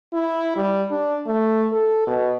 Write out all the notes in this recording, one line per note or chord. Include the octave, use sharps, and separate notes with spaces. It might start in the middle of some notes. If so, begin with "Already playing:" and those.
E4
G3
D4
A3
A4
B2